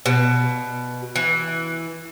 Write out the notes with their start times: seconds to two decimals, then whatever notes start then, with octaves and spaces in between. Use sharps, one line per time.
0.06 B2
1.16 E3